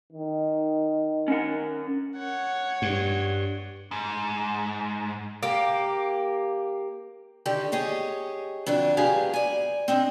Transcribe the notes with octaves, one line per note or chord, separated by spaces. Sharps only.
D#3
C#4 A#4 F#5
C#5 F#5
G2
G#2
A#3 G4
D3 D#3 G4 A4 D5
G4 G#4 C#5 D#5
F2 D3 D4 F#4
F#3 G#3 B3 G4 G#4 F5
D5 G#5
C4 D4 D#4